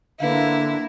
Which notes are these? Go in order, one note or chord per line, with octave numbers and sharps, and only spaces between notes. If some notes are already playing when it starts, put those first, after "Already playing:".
D3 A#3 E4 B4 F5